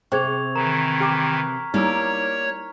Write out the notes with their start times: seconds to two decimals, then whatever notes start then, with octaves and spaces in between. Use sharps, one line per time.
0.12 C3 G#4 C5 G5 C#6 G#6 F7
0.56 D#3 E3 A#4 A#5
1.00 G4 G5 A#5 D6 F6 B6
1.74 G3 A#3 D#4 E4 C#5 E6